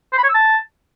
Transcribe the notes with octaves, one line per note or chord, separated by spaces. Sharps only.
C5
B5
C#5
E6
A5